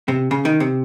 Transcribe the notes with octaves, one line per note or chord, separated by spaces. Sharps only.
C3
C#3
D#3
C3